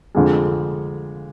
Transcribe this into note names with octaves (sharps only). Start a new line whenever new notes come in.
F2 D3 G#3